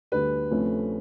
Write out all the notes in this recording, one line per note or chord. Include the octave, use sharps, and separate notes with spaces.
D2 D3 G3 B4
D2 C3 F3 A3 C#4